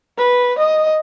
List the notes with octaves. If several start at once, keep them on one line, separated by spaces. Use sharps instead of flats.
B4
D#5